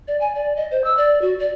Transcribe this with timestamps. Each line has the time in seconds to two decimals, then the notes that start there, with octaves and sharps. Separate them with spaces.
0.08 D5
0.21 G#5
0.35 D5
0.56 D#5
0.71 C5
0.84 E6
0.97 D5
1.22 F#4
1.39 D5